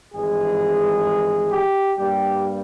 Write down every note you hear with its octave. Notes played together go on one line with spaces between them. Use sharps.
G#1 G2 E3 G#3 G#4
G4
G2 G3 A#3 G4